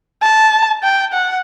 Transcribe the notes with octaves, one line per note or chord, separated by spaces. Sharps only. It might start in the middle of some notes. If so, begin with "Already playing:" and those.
A5
G5
F#5